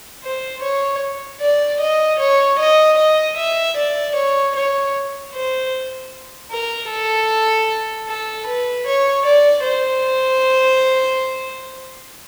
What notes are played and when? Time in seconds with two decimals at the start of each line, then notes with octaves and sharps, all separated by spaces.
0.23 C5
0.63 C#5
1.41 D5
1.81 D#5
2.19 C#5
2.60 D#5
2.98 D#5
3.37 E5
3.77 D5
4.16 C#5
4.56 C#5
5.34 C5
6.51 A#4
6.90 A4
8.08 A4
8.47 B4
8.87 C#5
9.26 D5
9.65 C5